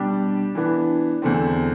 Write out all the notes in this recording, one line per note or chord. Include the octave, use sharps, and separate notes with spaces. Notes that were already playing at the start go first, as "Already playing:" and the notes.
Already playing: B2 G3 D4 G4
E3 B3 D4
E2 D3 A3 C4